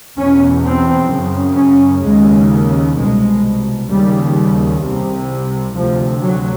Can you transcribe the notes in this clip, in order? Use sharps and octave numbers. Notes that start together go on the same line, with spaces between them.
E2 B2 C#4
C4
F#2 C#3
C#4
D#2 C#3 G#3
C2 B2 G#3
D#2 C#3 G3
C2 C3
D2 C3 F3
F#3